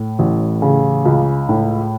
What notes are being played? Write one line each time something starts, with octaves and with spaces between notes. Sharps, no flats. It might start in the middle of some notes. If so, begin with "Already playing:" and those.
Already playing: A2
A1
C#3
C#2
A2